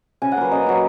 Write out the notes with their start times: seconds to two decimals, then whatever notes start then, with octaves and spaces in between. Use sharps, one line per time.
0.22 C#3 G#5
0.32 F#5
0.37 F#3 A#3 B4
0.52 C#3 D#5
0.67 F#3 A#3